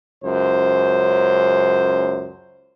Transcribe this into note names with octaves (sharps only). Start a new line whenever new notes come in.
C#2 F#2 C5